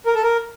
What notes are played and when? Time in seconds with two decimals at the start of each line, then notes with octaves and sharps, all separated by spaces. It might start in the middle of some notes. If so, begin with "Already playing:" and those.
0.06 A#4
0.15 A4
0.23 A#4